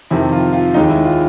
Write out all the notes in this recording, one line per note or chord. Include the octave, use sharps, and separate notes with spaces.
F2 C3 D#3 E4
F4
F4
D#2 D#3 G#3 D#4
E4
F4